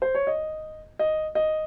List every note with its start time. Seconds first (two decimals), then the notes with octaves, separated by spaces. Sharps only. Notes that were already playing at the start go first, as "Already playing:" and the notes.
0.02 C5
0.15 C#5
0.27 D#5
0.99 D#5
1.35 D#5